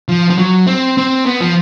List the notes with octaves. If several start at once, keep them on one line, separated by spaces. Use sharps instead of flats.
F3
F3
F#3
C4
C4
B3
F3